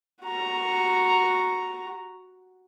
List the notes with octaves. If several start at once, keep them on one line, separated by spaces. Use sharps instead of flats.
F#4 A#5